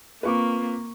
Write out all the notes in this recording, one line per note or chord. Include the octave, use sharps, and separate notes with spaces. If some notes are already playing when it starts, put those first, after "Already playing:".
A#3 C4 F4 B4 B5 C#6 D6